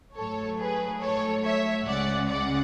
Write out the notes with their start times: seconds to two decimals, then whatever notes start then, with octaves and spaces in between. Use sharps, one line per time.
0.16 G#2 F#3 A3 A4 C#5
0.58 G#4 B4
1.01 A4 C#5
1.44 C#5 E5
1.87 C#2 C#3 G#3 D5 F#5
2.29 D5 F#5